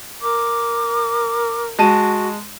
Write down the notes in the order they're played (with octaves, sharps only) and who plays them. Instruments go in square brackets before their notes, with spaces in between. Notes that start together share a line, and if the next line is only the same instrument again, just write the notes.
[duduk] A#4 [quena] D6
[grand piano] G#3 A5 D#7 [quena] F#4